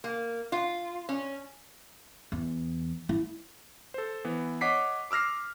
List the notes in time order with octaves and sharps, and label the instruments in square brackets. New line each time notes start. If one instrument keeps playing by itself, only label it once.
[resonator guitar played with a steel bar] A#3
F4
C#4
[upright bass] E2
E4
[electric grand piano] A4 C5
E3 B3
C#5 D#5 F#5 D6 B6 C7
D6 E6 F6 A#6 C7